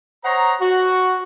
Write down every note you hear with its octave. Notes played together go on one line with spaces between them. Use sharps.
C5 C#5 D#5 F#5 A#5
F#4